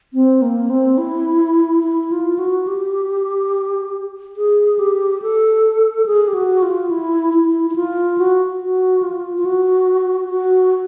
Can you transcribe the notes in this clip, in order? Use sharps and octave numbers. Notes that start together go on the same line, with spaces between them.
C4
A#3
C4
E4
E4
F4
F#4
G4
G#4
G4
A4
G#4
G4
F#4
F4
E4
E4
E4
F4
F#4
F#4
F4
F4
F#4
F#4